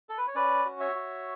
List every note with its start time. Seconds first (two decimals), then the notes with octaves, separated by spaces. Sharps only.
0.09 A4
0.18 B4
0.27 C#5
0.35 C#4 B4 D5
0.65 F#4
0.80 C#5 E5
0.95 F#4